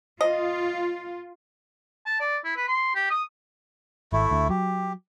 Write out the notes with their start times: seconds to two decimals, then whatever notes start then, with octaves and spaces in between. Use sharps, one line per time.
0.21 F4 D#5
2.06 A5
2.20 D5
2.45 E4
2.57 B4
2.68 C6
2.95 G4
3.11 D#6
4.13 G#1 A3 E4
4.31 D2
4.50 F#3 G4